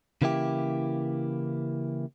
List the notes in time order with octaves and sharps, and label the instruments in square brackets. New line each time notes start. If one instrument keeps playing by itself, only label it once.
[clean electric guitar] C#3 E3 A#3 E4 G4